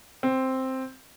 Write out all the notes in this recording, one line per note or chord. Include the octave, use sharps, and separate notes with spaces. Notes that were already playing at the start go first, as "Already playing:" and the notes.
C4